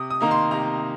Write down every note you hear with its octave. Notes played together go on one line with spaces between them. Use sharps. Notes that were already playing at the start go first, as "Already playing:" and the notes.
Already playing: C3 D#6
D#6
D#3 A#3 D#4 A#5
C6
C3 A#5